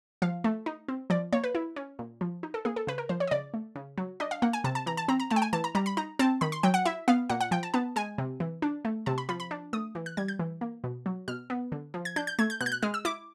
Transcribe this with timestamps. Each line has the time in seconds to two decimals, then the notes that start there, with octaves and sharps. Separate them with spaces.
0.22 F3 F5
0.44 A3
0.66 D#4
0.88 C4
1.10 F3 D5
1.33 A#3 C#5
1.44 B4
1.55 E4
1.76 C#4
1.99 A#2
2.21 F3
2.43 D#4
2.54 A4
2.65 A#3 G#4
2.76 A4
2.87 C#3 B4
2.98 A#4
3.09 F3 C5
3.20 C#5
3.27 D#5
3.31 C#3 D5
3.54 A3
3.76 C#3
3.98 F#3
4.20 D4 D#5
4.31 F5
4.42 A#3 F#5
4.53 G#5
4.64 C3 A5
4.75 A5
4.86 E3 A#5
4.97 A5
5.08 C4 A#5
5.20 A#5
5.30 A3 A5
5.36 G5
5.42 G#5
5.53 E3 A5
5.64 A#5
5.75 G3 A#5
5.86 B5
5.97 D#4 A#5
6.19 C4 A5
6.41 D#3 B5
6.52 C6
6.63 F#3 G5
6.74 F#5
6.85 E4 E5
7.08 B3 F5
7.30 A#2 F#5
7.41 F#5
7.51 F3 G5
7.63 A5
7.74 B3 A5
7.96 G#3 G#5
8.18 C3
8.40 E3
8.62 D4
8.85 A3
9.06 C3 A5
9.18 B5
9.29 F3 B5
9.40 B5
9.51 D4
9.73 A3 D#6
9.95 E3
10.06 F#6
10.17 G3 G#6
10.28 G6
10.39 E3
10.61 A#3
10.84 B2
11.06 F#3
11.28 B2 F6
11.50 B3
11.72 D3
11.94 F3
12.05 G#6
12.16 D4 G6
12.27 G6
12.39 A3 G#6
12.50 G6
12.60 B2 F#6
12.66 G6
12.72 F#6
12.82 G#3 F6
12.94 E6
13.05 E4 D6